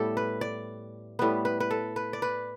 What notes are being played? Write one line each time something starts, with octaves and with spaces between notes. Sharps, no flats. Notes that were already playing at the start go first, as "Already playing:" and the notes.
Already playing: A2 G3 B3 G4 A4
B4
D5
A2 G3 B3 B4
B4
B4
A4
B4
D5
B4